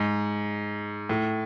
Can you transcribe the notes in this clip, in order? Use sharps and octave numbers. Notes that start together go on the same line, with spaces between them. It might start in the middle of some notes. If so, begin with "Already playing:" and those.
Already playing: G#2
A2